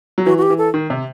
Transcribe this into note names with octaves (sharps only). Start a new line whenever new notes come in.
F#3
E3 F#4
F#4
G4
E3
A4
D#3
C3